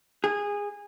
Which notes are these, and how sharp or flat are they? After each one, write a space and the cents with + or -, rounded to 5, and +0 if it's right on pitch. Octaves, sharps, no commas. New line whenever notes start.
G#4 -20